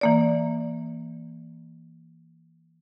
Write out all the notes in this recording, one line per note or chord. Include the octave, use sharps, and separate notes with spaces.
E3 A#3 D5